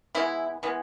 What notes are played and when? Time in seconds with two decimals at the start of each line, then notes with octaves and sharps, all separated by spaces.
0.15 E3 G#3 B3 E4
0.63 E3 G#3 B3